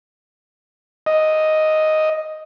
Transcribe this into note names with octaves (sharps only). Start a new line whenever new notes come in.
D#5